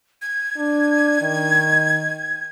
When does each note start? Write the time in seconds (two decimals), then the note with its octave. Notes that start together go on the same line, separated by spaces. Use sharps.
0.22 G#6
0.57 D4
1.22 D#3